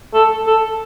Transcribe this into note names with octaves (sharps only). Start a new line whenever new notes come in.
A4
A4